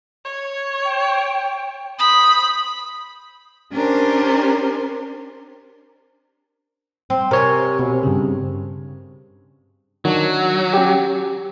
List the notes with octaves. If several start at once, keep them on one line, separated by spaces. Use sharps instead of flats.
C#5
G5
C5 B5 D#6
C#4 D4 G4 A#4 C5
C4
C3 A#4 C#5 G#5
B2
G2 C#3
D#3 F#3 D4
C#4 G4